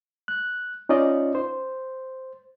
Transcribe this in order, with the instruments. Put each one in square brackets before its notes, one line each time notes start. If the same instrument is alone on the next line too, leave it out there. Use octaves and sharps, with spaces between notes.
[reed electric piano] F#6
C#4 D#4 F4 D5 D#5
C5